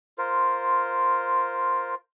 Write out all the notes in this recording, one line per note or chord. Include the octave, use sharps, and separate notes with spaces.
F4 A#4 C5